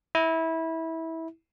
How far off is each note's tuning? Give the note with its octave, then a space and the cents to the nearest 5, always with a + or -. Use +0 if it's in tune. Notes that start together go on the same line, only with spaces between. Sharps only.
E4 -20